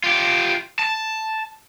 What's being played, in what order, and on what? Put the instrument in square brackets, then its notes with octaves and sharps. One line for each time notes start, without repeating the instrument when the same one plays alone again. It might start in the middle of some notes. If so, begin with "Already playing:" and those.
[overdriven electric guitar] F4 G4
A5